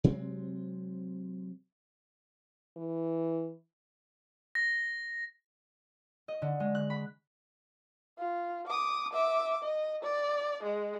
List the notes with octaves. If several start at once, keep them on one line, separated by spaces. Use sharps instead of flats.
C3 F#3 G#3 C4
E3
A#6
D#5
D3
G#3
F#6
B5
F4
D6 D#6
E5 D6
D#5
D5
G#3